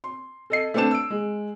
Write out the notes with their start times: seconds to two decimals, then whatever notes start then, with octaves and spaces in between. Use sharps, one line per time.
0.04 C6
0.50 A4 D#5 C7
0.74 A3 B3 C4 D4 A5 E7
0.91 E6 D7
1.10 G#3